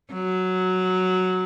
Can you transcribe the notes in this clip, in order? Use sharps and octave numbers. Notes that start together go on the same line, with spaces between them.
F#3